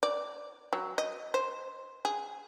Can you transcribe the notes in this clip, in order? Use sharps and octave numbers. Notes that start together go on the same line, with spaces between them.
D5
F#3
D#5
C5
G#4